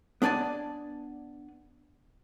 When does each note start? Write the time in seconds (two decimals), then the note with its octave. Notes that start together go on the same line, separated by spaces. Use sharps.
0.22 B3 D4 D5 G#5 A5